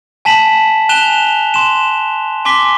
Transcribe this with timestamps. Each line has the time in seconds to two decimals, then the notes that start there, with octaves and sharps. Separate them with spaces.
0.25 G#5 A5 B6 E7 F#7
0.89 G#5 F#6 E7 F7 G7
1.54 C6 E7
2.45 G#5 C6 D6 B6 G7